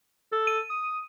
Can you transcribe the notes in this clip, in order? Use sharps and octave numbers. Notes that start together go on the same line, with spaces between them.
A4
D#7
D#6